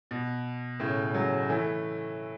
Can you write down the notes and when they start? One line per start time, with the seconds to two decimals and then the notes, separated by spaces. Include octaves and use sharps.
0.11 B2
0.80 A2 C#3
1.14 C#3 F#3
1.49 E3 A3